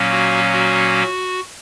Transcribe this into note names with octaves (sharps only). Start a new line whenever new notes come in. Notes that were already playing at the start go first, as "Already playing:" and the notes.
Already playing: A#2 F#3 A#3 C#4
F#4
F#4